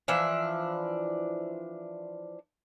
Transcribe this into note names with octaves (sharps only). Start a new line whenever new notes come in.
E3 F3 D4 E5